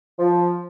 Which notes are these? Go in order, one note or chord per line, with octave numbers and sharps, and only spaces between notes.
F3